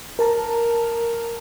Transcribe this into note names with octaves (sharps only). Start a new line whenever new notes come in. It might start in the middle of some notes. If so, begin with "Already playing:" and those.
A#4 A5 A#5